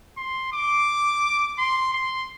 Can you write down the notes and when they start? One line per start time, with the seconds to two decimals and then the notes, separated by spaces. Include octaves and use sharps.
0.17 C6
0.53 D6
1.58 C6
1.94 C6